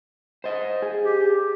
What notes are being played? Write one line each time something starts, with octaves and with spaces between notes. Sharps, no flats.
C5 D#5
G#4
G4